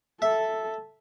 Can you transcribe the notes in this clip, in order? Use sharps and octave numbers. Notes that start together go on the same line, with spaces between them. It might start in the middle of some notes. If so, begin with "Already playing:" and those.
A4 E5